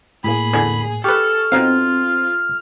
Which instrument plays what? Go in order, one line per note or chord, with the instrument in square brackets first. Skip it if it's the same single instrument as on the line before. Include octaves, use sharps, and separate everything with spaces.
[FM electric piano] A2 A#3 [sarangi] G#4 [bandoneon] B5
[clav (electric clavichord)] E2 D3 G#5
[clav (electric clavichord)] G4 B4 [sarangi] A4 [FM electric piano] C#6 [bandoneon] F6
[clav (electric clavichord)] B2 D#4 F5 [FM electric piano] C4 [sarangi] F4